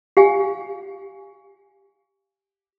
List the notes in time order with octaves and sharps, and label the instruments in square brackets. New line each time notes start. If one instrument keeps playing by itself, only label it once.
[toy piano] G4 F5 G#5